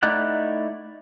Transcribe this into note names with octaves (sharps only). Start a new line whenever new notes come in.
A3 D#4 E4 D5 F#5